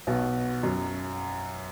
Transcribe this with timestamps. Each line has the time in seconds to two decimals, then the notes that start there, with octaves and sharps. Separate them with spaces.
0.07 B1 B2
0.63 F#2 F#3